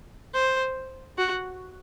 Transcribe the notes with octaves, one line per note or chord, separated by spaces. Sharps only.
C5
F#4